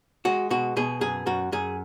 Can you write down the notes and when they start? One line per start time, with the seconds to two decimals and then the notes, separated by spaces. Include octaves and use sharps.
0.25 G#3 F#4
0.50 B2 F#4
0.77 B2 G#4
1.01 F#2 G#4
1.26 F#2 F#4
1.52 F#2 G#4